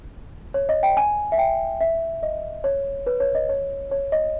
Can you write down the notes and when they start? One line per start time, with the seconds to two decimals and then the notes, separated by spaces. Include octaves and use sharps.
0.54 C#5
0.69 D#5
0.83 G5
0.97 G#5
1.32 E5
1.38 G5
1.81 E5
2.23 D#5
2.64 C#5
3.07 B4
3.20 C#5
3.35 D#5
3.49 C#5
3.91 C#5
4.12 D#5